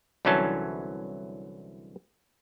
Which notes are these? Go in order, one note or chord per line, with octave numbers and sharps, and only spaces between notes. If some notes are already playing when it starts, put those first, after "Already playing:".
C2 D3 E3 F#3 C#4 A5